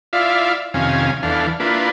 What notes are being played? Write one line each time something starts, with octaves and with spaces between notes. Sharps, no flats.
E4 F4 D5 E5 F5
F2 C3 D#3 C#4 F5 G#5
E2 E3 D4 A4 F5
A#3 D4 E4 F4 B4